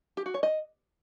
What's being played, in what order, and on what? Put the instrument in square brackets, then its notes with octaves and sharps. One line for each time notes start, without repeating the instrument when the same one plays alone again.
[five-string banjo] G4
F#4
C#5
D#5